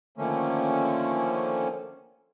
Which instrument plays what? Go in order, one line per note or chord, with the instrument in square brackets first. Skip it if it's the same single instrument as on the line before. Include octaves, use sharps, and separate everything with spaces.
[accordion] D3 D#3 F3 A3 A#3 C#4